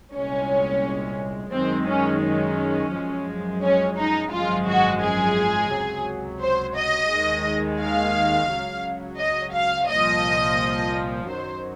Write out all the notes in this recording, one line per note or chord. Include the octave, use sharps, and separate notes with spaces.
C2 A#2 G#3 C#4
F#2 D#3 G#3 C4
C#4
C#4
F#2 F3 G#3
C#4
D#4
G#1 F#2 F3 G#3 F4
F#4
G#4
C#2 C3 F#3
C5
D#5
D#2 D#3 G#3
F5
C#2 C#3 F#3
D#5
F5
C2 A#2 F3 D#5
F#2 D#3 F#3 C5